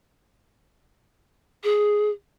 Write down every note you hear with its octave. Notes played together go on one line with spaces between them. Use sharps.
G#4